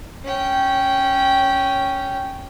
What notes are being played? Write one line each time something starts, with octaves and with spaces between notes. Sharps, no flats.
C#4 G5